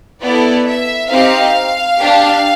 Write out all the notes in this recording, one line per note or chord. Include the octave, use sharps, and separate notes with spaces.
B3 E4 A4 D5
E5
C4 D#4 G4 F5
D4 G4